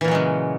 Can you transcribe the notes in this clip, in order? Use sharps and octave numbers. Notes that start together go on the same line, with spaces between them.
A#2 C#3 E3 F#3 G#3